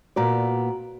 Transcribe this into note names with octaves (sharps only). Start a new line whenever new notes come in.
A#2 B3 F#4 D5 A#5